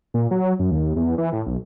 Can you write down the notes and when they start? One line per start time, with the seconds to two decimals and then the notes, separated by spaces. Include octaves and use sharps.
0.14 A#2
0.31 F#3
0.60 F#2
0.71 D#2
0.96 E2
1.18 E3
1.32 A2
1.46 B1